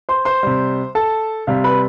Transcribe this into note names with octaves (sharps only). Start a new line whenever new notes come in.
C5 C6
C5 C6
C3 G3
A4 A5
C3 G3 F5
B4 B5